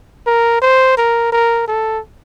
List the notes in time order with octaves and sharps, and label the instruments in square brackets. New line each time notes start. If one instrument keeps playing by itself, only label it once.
[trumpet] A#4
C5
A#4
A#4
A4